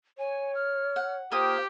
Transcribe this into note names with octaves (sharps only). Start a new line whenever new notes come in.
C#5 G#5
F6
F#5
A#3 F4 G4 C5 D#6